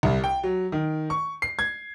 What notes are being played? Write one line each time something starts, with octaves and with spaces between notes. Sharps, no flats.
C2
G5
F#3
D#3
C#6
C7
G#6